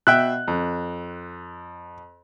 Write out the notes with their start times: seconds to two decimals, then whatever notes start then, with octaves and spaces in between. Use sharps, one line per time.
0.07 B2 E5 G5 F#6
0.48 F2